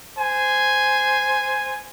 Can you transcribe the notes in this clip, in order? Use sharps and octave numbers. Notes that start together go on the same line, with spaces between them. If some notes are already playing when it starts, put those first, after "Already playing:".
C5 G#5